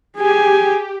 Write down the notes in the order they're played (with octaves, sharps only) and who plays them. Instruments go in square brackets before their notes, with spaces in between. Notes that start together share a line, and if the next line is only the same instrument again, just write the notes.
[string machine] G4 [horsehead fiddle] G#4 G#5